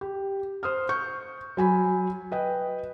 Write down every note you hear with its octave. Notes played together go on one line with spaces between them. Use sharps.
G4
C5 D#6 F6
C#6 G6
F#3 G#5 B5
B4 D#5 G5